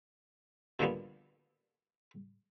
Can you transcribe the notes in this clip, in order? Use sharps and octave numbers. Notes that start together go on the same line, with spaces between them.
B2 D3 F3 G3 A#3 B3